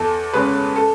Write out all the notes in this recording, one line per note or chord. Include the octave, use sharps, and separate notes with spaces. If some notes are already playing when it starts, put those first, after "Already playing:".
Already playing: E2 A4
C#3 G#3 C#4 B4
A4